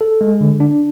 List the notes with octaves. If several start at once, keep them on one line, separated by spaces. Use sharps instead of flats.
A4
G#3
D3
D4